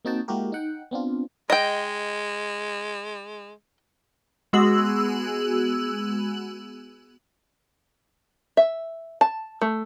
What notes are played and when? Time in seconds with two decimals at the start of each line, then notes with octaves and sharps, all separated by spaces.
0.05 A#3 C4 D#4 F#4 G5 A5
0.28 G#3 A#3 E4 F#4 G4 A#4
0.52 D#4 F#5 G5
0.91 B3 C4 D4 F4
1.50 G#3 D#5 G5
4.53 G#3 B3 F#4 G#4 E6 F#7
8.57 E5
9.21 A5
9.62 A3